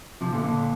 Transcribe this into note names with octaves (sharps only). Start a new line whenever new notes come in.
C3 F3
A#2 D3
A#2 D3